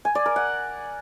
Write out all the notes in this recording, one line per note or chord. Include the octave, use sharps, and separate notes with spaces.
G#5
D5
A#4
F#5